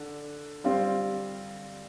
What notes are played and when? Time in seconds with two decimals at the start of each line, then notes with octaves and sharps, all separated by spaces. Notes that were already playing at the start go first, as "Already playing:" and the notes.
Already playing: D3
0.64 G3 C4 F4